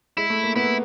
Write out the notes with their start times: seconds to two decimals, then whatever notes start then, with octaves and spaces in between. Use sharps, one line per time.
0.17 G#3 E4
0.30 A3
0.44 A#3
0.56 B3 E4
0.64 A#3